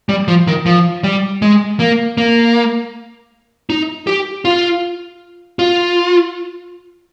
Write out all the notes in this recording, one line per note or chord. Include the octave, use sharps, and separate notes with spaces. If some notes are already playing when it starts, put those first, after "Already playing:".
G3
F3
D#3
F3
G3
G#3
A#3
A#3
D#4
G4
F4
F4